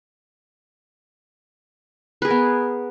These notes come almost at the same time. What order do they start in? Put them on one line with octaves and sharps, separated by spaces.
B4 G#4 A#4 B3